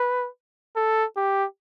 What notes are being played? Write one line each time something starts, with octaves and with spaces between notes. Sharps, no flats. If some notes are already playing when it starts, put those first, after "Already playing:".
Already playing: B4
A4
G4